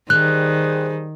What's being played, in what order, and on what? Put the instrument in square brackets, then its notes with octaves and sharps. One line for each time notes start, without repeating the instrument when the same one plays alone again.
[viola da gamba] D#3 [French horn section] G3 G#4 C5 [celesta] F#6